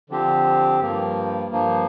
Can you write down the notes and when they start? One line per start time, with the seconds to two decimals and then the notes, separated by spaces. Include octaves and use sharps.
0.10 D3 F3 C4 G4
0.80 G2 F3 A#3
1.51 G2 F3 A#3